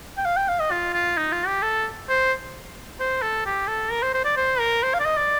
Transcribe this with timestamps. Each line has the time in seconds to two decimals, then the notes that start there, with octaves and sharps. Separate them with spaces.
0.18 G5
0.25 F5
0.37 G5
0.49 F5
0.60 D#5
0.71 F4
0.93 F4
1.17 D#4
1.32 F4
1.47 G4
1.62 A4
2.09 C5
3.00 C5
3.22 A4
3.46 G4
3.68 A4
3.92 A#4
4.03 C5
4.14 C5
4.25 D5
4.37 C5
4.59 A#4
4.83 C5
4.94 F5
5.00 D5
5.05 D#5
5.17 D5